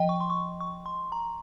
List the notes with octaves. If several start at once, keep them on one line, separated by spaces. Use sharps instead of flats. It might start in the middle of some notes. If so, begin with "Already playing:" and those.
Already playing: F3 D#5 G5
C#6
C6
C#6
C#6
C6
A#5